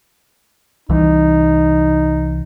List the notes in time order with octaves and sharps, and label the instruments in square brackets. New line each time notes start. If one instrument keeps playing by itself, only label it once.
[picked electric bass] C2 E3 [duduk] D#4